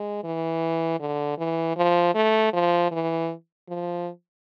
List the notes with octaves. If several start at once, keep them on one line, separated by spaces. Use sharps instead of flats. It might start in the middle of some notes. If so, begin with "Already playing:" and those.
Already playing: G#3
E3
D3
E3
F3
A3
F3
E3
F3